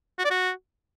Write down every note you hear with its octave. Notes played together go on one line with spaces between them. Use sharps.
F#4
D5
F#4